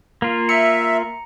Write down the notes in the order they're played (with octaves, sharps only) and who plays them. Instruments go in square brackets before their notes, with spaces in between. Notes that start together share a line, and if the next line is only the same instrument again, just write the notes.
[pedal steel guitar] A#3 F4
[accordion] E5 [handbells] A#5 C#7